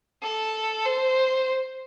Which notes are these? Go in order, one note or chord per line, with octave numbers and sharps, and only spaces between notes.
A4
C5